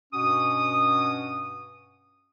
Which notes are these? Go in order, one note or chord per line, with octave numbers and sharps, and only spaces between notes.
G2 B2 C#4 F#4 D#6